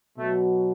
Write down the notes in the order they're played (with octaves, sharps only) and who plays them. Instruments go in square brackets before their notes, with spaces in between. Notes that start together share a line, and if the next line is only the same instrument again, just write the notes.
[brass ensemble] B2 F#3 A3